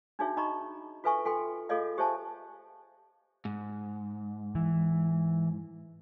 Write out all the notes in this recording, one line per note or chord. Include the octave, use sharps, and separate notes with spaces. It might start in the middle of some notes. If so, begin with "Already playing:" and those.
D4 D#4 F#4 G#4 C#5 E5
D#4 D#5 A#5 B5 C#6
F4 A4 B4 E5 G#5 C#6
F4 A4 G5 C6
F4 G#4 A4 C#5 D#5 F5
G4 C5 C#5 E5 G#5 A5
G#2
E3